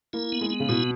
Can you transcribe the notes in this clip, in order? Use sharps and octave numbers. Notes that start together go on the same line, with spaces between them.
A#3 E4
B3
G#3
B3
C#3
B2 E4